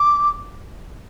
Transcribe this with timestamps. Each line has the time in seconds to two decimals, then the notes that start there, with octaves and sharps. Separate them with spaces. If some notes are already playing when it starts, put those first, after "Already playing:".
Already playing: D6